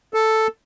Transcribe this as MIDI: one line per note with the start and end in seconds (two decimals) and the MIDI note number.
0.14 0.47 69